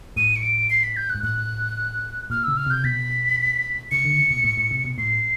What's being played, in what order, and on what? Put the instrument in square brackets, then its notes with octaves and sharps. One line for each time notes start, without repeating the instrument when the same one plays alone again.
[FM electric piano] A2 [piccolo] D#7
[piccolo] C#7
D7
C7
B6
G6
F#6
[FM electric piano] G#2
[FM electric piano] A2 [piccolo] F#6
[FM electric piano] A#2 [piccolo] F6
[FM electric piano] C#3 [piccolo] E6
[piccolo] F6
[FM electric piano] C3 [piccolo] G6
[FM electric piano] B2 [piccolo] B6
[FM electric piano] C#3 [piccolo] C#7
[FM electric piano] D3
C#3
B2
A2
A2
C3
B2
[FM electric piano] A2 [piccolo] C7